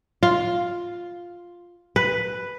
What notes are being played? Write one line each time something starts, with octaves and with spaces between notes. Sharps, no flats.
F4
B4